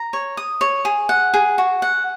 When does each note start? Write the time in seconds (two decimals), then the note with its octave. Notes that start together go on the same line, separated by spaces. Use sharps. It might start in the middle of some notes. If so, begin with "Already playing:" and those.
Already playing: A#5
0.13 C#5
0.37 D#6
0.61 C#5
0.85 G#4
1.09 F#5
1.34 G#4
1.58 F#4
1.82 F#5